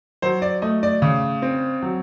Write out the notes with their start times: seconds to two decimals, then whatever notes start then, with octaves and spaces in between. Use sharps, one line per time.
0.22 F#3 C5
0.42 D5
0.62 A3 D#5
0.83 D5
1.02 C#3
1.42 C4
1.83 F#3